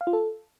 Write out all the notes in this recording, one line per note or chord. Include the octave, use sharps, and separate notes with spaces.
F5
F4
A4